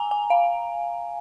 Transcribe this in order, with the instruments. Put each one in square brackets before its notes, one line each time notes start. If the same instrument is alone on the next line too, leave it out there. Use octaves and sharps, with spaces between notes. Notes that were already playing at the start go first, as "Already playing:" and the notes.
Already playing: [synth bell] G#5 A#5
G#5
F5